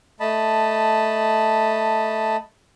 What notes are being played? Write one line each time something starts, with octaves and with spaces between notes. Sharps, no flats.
A3 D#5 A5 B5